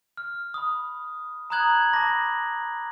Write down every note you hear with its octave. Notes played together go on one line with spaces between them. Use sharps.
F6
B5 D#6
A#5 B5 D#6 F#6 G#6 F#7
A5 B5 D6 A#6